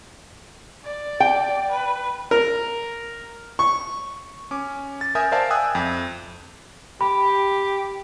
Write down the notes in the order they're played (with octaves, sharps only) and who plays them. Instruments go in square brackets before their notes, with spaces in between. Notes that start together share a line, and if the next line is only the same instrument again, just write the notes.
[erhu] D5
[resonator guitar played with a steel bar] G5
[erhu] B4
[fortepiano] A#4
C#6
[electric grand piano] C#4 D6
A6
A#4 E5 G#5 D#6 G6
A#4 C5 D5 E5 F5 A5
E5 G5 G#5 D#6 E6 F#6
F2
[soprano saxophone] G4 [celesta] B5